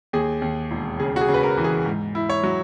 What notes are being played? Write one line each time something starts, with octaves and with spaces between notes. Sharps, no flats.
D#2 G#4
D#2
E1
C#3 G#4
F#4
G#4
C#3
B4
A#4
E3
G#4
G#2
E4
C#5
F#3